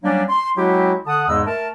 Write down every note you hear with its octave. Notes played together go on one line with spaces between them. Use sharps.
F#3 G3 A#3 C#4 D4
C6
F#3 G#3 C4 E4 F#4 G4
D3 F#5 A5 D#6
E2 G#2 C#3 G#3 D#5 E6
A3 A#4 A5